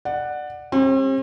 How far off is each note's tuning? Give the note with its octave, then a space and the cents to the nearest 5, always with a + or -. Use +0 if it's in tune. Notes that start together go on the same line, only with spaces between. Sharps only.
D5 +20 F#5 +0
G3 +40 C4 +45